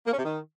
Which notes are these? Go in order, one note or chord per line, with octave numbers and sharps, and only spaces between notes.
A#3
C#4
C3
D#3